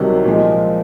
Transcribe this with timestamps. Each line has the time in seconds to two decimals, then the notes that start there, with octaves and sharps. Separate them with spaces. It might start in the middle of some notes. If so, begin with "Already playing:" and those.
Already playing: C2 C3 D#3 F#3
0.25 A#2 F3 G#3